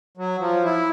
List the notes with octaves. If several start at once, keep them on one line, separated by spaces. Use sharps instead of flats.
F#3
F3
E4